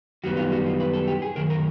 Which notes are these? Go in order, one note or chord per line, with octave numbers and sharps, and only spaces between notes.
F#2 D#3 G3 B3 F#4
F4
F#4
F4
B4
A4
G4
G#4
F#2 D#3 A#4
A#4